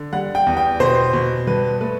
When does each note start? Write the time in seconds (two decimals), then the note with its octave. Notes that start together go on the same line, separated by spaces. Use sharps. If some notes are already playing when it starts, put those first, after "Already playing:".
Already playing: D3
0.13 G3 F#5
0.35 G5
0.46 E2
0.57 G5
0.80 B2 C5
1.13 B2
1.47 G2 B4
1.80 A3 B4